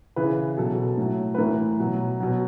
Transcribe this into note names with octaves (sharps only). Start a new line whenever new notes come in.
C#3 E3 B4
B2 F#3 A4
A2 F#3
B4
A2 E3 A#4
B2 F#3
B2 F#3